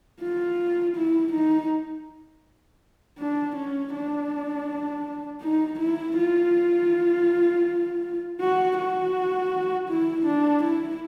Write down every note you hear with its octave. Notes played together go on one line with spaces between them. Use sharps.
F4
E4
D#4
D4
C#4
D4
D#4
E4
F4
F#4
F#4
E4
D4
E4